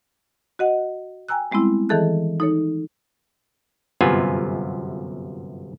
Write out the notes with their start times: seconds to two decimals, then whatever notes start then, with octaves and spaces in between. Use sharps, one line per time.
0.59 F#4 D#5 F#5
1.29 G5 G#5 A#5 E6 F#6
1.51 G3 G#3 B3 C4 E4
1.89 D#3 E3 G#4 A4 A5 F#6
2.40 D#4 A4 C#5
4.01 G1 F#2 C3 B3 F4 G#5